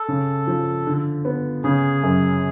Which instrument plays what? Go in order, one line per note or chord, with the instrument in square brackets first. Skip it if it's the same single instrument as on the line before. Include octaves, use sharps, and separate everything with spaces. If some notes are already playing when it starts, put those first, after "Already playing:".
Already playing: [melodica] A4
[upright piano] C#3
F3
D3
B3
[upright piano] C#3 [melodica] G#4
[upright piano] F#2